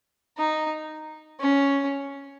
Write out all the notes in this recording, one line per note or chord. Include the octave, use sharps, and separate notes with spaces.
D#4
C#4